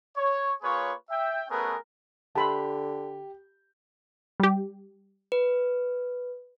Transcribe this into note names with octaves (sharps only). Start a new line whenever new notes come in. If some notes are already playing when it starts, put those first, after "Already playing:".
C#5
A#3 F4 G#4 B4 C#5
E5 G5
A3 B3 C#4 G#4 A#4 B4
D3 G4 A5 B5 C6
G3 G4
B4